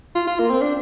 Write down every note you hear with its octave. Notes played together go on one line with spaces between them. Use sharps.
F4
F4
A#3
C4
D4